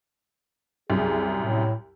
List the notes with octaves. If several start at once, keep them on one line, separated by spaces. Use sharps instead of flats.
C2 F#2 G#4
A2